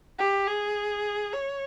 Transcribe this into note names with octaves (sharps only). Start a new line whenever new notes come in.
G4
G#4
C#5